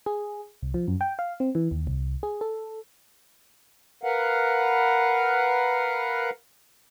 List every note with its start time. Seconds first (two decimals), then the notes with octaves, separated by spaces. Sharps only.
0.06 G#4
0.62 C2
0.74 F3
0.88 F#2
1.01 G5
1.19 F5
1.40 C4
1.55 E3
1.71 D#2
1.87 C2
2.23 G#4
2.41 A4
4.04 A#4 B4 F5 F#5